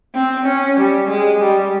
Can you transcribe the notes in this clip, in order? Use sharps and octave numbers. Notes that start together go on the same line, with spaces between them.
C4
C#4
G3
G#3
G3